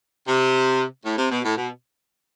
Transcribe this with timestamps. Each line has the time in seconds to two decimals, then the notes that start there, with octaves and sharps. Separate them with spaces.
0.28 C3
1.05 A2
1.18 C3
1.31 B2
1.45 A2
1.56 B2